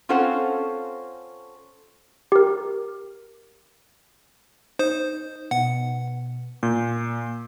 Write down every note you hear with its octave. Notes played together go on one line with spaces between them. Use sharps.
C4 C#4 F4 A4 C5 F#5
G4 A#4
D#4 C5
B2 F#5
A#2 G6